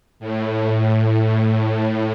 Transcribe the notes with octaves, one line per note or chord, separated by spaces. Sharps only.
A2
A2